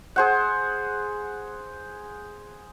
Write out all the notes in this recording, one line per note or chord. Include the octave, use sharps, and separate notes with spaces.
G#4 C5 F#5